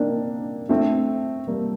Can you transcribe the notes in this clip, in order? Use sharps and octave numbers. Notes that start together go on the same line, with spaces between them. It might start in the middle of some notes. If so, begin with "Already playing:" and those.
Already playing: A#3 C4 D4 D#4
A3 C4
G3 A#3